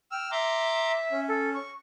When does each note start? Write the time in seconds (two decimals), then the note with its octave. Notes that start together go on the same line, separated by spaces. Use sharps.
0.11 G5 E6 F6
0.31 E5 A#5 C6 D6
1.12 C#4
1.28 A4
1.53 C#6